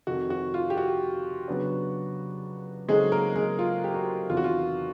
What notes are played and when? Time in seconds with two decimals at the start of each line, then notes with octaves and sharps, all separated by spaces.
0.07 F2 C3 D#3 F#4
0.30 F#4
0.54 F4
0.70 G4
0.77 F#4
1.48 C#3 F#3 B3 D4
2.89 C#3 F#3 G#3 A3 C4 D#4 G#4
3.12 A#3 A#4
3.36 G#3 G#4
3.59 F4
3.84 G4
3.94 F#4
4.30 E2 C3 D#3 F4
4.37 F#4
4.44 F4